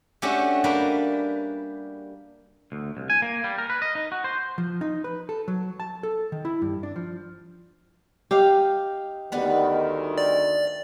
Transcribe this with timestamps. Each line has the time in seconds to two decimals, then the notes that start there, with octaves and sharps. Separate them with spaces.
0.22 A3 C#4 D4 F#4 G4
0.64 G3 A#3 D4 G4 A#4 B4
2.72 D2
2.97 C2
3.10 G#5
3.22 A#3
3.44 G3
3.58 A#4
3.70 B4
3.82 D#5
3.95 D#4
4.12 F#4
4.24 C5
4.58 F3
4.81 D#4
5.04 B4
5.29 A4
5.48 F#3
5.80 A5
6.03 A4
6.32 D#3
6.45 E4
6.62 G2
6.83 D4
6.96 F3
8.31 D#4 G4 F5
9.32 D2 D#3 G3 B3 B4
10.18 D5